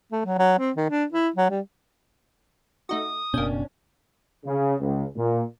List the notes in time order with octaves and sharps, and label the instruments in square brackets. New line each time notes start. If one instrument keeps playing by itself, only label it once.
[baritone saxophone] A3
F#3
F#3
C4
D#3
D4
E4
F#3
G3
[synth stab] A3 D#4 F#4 [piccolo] D#6
[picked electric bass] F#1 B2 [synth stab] A#3 G6 [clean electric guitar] C#4 D4
[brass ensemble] C#3
C#2
A#2